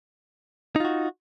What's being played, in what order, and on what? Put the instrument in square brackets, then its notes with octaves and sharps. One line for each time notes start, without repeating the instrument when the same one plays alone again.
[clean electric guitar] D#4
F4
F#4